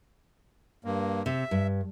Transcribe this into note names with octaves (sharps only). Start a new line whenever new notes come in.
G2 A#3
C3 E5
G2